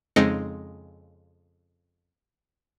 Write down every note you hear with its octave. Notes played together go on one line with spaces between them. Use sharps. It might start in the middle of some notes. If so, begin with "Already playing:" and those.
F2 C#3 G#3 C4 D#4 C#7